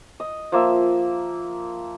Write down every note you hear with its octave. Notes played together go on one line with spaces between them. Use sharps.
D#5
F3 A#3 E5